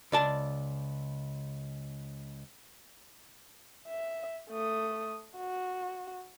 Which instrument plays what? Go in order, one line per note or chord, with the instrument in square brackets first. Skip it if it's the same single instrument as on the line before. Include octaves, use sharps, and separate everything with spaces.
[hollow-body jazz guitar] C#2 D5 A5
[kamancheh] E5
A3 D#6
F#4